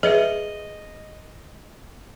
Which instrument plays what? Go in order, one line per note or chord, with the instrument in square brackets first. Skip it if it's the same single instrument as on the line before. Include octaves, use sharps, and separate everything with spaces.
[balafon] G#4 B4 E5 [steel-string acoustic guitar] D#5